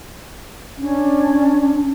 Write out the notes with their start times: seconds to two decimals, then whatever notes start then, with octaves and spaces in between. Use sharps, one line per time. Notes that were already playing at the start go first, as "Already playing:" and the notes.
0.78 C#4 D4